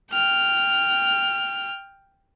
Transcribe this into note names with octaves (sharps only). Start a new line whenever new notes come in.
G5 F6